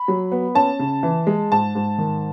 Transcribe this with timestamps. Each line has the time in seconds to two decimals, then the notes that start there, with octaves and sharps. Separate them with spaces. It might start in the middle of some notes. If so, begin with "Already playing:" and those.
Already playing: B5
0.08 F#3
0.32 B3
0.55 C#4 A5
0.79 C#3
1.03 E3
1.27 G#3
1.51 G#2 A5
1.75 G#2
1.98 D#3